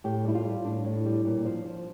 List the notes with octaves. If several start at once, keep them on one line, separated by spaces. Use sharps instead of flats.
A2 G4
G3 E4
F4
G3
A2 D4
A2
G3
A#2
F3
F3